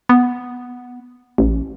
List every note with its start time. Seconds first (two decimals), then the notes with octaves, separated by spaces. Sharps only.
0.09 B3
1.38 A1